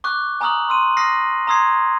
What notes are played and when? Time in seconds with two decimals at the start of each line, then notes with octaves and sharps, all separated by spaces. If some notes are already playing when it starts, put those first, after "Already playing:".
0.04 C#6 D6 F#6
0.41 G#5 A#5 C#6 D#6 F6 F#7
0.69 C6 E6 D#7
0.97 D#6 F6 A#6 C7
1.47 A#5 C6 D#6 E6 G#6 C7